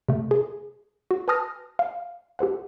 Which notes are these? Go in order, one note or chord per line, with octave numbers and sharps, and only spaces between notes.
C3 A3
G#4
F#4
B4 G#5 A5 D#6 F6 A#6
F5
G4 A4 C5 F#5